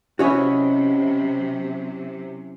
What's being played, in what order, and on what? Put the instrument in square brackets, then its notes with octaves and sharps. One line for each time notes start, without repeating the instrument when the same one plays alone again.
[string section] C3 F#3 [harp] C#4 E4 [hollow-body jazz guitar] F#4 C#5 D#5